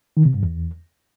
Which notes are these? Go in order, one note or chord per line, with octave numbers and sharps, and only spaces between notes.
D#3
C3
G2
E2